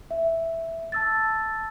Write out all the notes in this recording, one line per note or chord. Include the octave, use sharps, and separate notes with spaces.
E5
A5 E6 A6